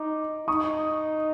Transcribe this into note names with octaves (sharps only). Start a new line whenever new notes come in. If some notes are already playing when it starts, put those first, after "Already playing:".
Already playing: D#4 D6
D#4 C#6 D#6